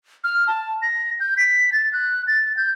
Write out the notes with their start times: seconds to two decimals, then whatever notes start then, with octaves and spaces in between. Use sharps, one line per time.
0.24 F6
0.47 A5
0.82 A#6
1.20 G6
1.37 B6
1.72 A6
1.93 F#6
2.27 A6
2.57 G6